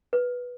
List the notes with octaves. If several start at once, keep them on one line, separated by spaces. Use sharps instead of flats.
B4